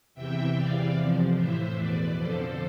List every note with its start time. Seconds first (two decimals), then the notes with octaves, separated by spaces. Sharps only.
0.14 E2 C3 E3 E5 G5
0.55 E2 C3 E3 D5 F5
0.96 F2 C3 F3
1.36 A2 E3 C5 E5
1.77 E2 B2 B4 D5
2.17 F2 D3 F3 A4 C5